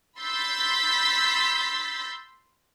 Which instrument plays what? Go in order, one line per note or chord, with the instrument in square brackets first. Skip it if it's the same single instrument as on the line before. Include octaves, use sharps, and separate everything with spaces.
[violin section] B5 C6 E6 G6 A6 B6